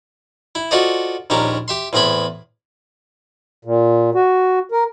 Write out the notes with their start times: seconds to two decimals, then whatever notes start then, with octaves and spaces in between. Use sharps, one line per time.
0.55 E4
0.71 F4 F#4 A4 C5 D5 D#5
1.30 A#1 D#2 C#4 D4 G4 A#4
1.68 G4 E5 C6
1.93 E2 A2 C4 G#4 B5
3.65 A#2
4.15 F#4
4.72 A#4